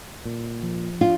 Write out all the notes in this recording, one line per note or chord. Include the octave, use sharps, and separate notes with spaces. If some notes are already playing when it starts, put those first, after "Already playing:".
A#2
F3
D4 F4